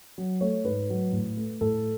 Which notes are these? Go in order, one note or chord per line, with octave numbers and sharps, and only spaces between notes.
F#3
A3 C#5
G#2 B4
F#3
A2
A3
A2 A4